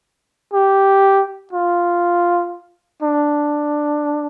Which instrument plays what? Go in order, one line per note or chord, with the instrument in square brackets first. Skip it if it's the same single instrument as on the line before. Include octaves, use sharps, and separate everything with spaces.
[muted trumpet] G4
F4
D4